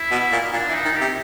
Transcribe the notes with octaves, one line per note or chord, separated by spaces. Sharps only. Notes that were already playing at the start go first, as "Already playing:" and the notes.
Already playing: E4
B2
A#2
A#2 D4
E3
D#4
D#3
C3 G4